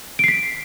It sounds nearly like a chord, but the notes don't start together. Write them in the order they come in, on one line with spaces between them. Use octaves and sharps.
D7 C7 B6